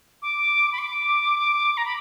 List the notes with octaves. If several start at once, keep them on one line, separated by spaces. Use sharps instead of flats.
D6
B5
D6
A#5
B5